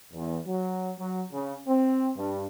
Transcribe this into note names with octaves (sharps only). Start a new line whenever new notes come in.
E2
F#3
F#3
C#3
C4
G2